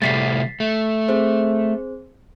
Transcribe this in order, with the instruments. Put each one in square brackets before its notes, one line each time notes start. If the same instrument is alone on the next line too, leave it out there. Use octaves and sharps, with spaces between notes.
[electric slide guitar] C3 G3 A3 [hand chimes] A6 B6 C7
[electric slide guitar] A3
[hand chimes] C4 G#4 C5